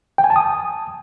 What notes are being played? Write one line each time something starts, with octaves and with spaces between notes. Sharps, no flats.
G5
G#5
A5
D#6